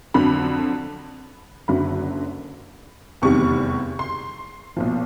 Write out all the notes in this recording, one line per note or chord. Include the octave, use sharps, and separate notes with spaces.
F2 D3 F#3 B5
F#1 F#2 D3 F#3 B5
F1 E2 C3 D#3 G3 C#6
C6
B1 A#2 F3